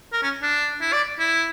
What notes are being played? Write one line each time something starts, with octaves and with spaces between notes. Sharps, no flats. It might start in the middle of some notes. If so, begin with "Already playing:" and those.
A#4
C#4
D4
E4
D5
E4